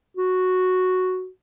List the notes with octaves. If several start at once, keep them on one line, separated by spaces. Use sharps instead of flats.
F#4